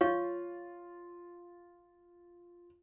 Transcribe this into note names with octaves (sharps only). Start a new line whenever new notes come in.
F4 C#5 F5 C#6